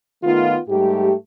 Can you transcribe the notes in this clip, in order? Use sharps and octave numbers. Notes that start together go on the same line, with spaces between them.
D#3 A3 B3 D#4 F4
G#2 G3 A3 G4